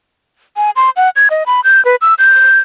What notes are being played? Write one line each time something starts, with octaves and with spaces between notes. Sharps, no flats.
G#5
C6
F#5
G#6
D#5
B5
G6
B4
E6
G6